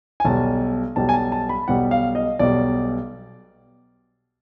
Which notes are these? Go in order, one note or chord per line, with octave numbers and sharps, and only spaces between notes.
G#5
B1 B2 G3 A5
B1 B2 G3 A5
G#5
A5
A5
B5
B1 B2 G3 F#5
F5
D#5
B1 B2 G3 D5